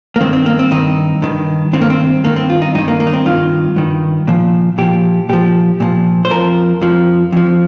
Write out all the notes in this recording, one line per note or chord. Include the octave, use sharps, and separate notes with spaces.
A#3
G2 D#3 C4
C4
A#3
C4
G2 D#3 D#4
G2 D#3
G2 D#3 C4
A#3
C4
G2 D#3 A#3
C4
F4
D#4
G2 D#3 D#4
A#3
A#3
D#4
C4
G2 D#3 F4
G2 D#3
A#2 F3
A#2 F3 G4
A#2 F3 G4
A#2 F3
C5
F2 F3 A#4
F2 F3
F2 F3